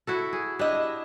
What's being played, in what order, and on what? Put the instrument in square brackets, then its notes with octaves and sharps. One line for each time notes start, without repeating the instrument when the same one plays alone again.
[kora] E4 F#4 A4
G#4
[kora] D4 E4 [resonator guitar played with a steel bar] G4 D#5